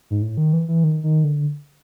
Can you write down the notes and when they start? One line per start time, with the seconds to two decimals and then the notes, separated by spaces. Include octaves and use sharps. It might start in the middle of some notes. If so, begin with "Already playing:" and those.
0.11 G#2
0.22 A2
0.37 D#3
0.53 E3
0.68 E3
0.84 D#3
1.04 D#3
1.24 D3